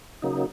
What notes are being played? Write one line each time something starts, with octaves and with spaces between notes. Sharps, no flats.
C#3 F#3 A#3 D#4